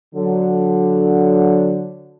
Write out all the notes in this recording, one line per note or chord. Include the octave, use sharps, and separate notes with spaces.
D3 F#3